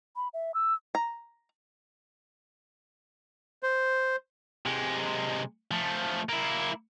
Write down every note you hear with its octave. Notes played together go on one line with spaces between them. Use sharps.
B5
E5
E6
A#5
C5
C3 G#3
F3 A3
A#3 E4